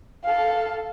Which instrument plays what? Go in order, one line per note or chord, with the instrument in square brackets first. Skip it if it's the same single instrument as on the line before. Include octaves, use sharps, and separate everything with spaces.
[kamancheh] A4 F5